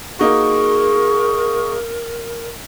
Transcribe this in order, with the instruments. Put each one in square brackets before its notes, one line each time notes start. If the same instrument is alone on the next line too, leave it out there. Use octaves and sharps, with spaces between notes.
[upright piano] A#3 D#4 F#4 [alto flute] G#4 [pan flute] A#4 [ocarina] C#6